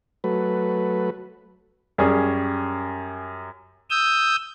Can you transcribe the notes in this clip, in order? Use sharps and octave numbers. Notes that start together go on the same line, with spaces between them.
F#3 A3 B4
F#2 G3 C#4 G#4
D#6 E6 G6